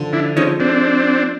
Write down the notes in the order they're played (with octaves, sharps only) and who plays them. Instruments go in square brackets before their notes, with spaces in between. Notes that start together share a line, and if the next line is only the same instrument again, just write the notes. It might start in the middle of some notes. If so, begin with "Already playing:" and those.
Already playing: [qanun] D3 F3
[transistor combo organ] D4 E4
[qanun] F3 G#3 [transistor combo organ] C#4 D#4
[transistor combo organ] C4 D4